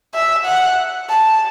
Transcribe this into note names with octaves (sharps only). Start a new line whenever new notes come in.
E5
F#5
A5